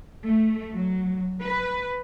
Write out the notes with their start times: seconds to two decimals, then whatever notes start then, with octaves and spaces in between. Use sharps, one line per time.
0.24 A3
0.75 F#3
1.42 B4